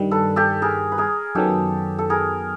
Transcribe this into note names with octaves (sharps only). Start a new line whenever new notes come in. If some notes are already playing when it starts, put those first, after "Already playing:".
Already playing: G2 D#3 G3
A4 B4
G4 A4
G#4 A#4
B4
G#4 A#4
F#2 D#3 F#3 B3 G4 A4
A4
G#4 A#4